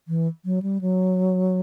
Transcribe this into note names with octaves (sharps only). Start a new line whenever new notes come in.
E3
F#3
G3
F#3